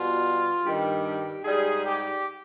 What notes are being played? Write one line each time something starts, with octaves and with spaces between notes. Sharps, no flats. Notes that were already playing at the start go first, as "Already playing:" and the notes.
Already playing: B2 G3 F4
G2 D#3 G3 G4
G4
G#2 G3 G#4
G4